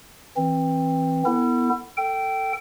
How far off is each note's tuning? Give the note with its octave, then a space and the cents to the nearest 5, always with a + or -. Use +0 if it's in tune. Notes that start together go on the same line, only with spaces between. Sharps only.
E3 -5 C4 +15
B3 +0 E4 +0 A4 +40
A4 +20 G5 -15